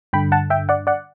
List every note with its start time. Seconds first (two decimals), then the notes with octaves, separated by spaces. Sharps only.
0.13 G2 D3 G5 B5
0.32 F#5 A5
0.50 E5 G5
0.69 D5 F#5
0.87 D5 F#5